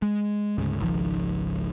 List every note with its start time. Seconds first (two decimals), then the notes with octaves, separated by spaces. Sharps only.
0.02 G#3
0.58 D2 G#2 C#3
0.80 G#1 C#2 D#3 F3